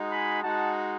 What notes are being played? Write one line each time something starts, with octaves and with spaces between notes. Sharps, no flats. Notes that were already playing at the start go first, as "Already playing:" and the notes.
Already playing: G#3 D#4 F#4
G#5 B5
G#3 D#4 F#4 F#5 A5